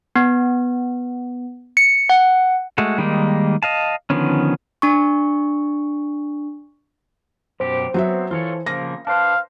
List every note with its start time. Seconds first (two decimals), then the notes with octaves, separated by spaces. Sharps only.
0.16 B3
1.77 C#7
2.10 F#5
2.78 G#3 A3 F#4
2.98 D#3 G3 G#3 A#3 D#4
3.63 D#5 F5 A5
4.10 D3 D#3 F3 B3 C#4
4.82 D4 C#6
7.60 F#2 B2 G4 C5
7.94 F#3 B3 C4 F#4 E5
8.31 E3 F4 A4 C#5
8.66 C#3 F3 A#3 A#6
9.07 D4 B4 C5 F5 A5